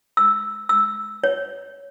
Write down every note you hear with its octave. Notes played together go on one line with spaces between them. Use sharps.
E6
E6
C#5